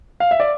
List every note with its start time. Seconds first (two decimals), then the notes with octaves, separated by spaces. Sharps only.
0.20 F5
0.31 E5
0.40 D5